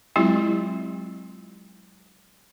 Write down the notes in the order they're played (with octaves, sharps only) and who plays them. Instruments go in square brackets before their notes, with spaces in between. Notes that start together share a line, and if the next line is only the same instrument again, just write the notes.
[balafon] F#3 G#3 C4 E4 F4 G4